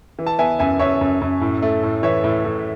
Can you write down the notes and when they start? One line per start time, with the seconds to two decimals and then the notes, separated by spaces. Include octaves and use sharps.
0.19 E3
0.27 A5
0.39 B3 E5 G#5
0.59 F#2 E5 G#5
0.79 F#2 C#5 E5
1.01 F#2
1.21 F#2
1.41 A2
1.62 A3
1.83 A2
2.03 E3 C#5 E5
2.24 A2
2.45 A2